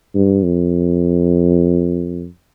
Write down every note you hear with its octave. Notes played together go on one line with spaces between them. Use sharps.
G2
F2